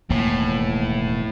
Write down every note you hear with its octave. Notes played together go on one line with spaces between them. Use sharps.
E1 D#2 A2 A#3